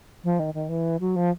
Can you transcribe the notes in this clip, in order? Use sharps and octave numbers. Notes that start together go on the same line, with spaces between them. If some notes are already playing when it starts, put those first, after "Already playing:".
F3
D#3
D#3
E3
F#3
F3